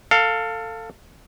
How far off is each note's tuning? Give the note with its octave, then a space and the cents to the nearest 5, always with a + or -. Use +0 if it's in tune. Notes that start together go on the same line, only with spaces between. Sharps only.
A4 +20 F5 +5